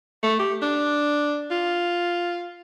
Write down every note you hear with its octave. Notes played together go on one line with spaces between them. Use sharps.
A3
G4
D4
F4